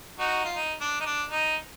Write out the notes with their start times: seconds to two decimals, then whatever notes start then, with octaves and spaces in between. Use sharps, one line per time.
0.19 D#4 F#4
0.45 F4
0.56 D#4
0.81 D4
1.00 D#4
1.06 D4
1.30 D#4